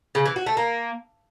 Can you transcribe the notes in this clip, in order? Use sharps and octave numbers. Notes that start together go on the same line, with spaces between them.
C#3
E3
F#4
A3
A#3